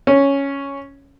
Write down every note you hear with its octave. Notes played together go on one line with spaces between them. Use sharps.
C#4